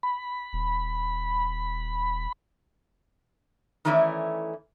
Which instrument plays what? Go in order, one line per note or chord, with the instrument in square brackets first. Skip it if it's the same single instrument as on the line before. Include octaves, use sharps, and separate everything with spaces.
[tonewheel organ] B5
[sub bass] D#1
[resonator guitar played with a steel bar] D#3 E3 A3 C#4 E4 D5